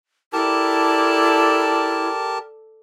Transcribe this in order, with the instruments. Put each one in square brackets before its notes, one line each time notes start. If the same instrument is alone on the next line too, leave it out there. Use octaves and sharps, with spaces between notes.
[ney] E4 [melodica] G4 A#4 A5 [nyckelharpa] A4 D5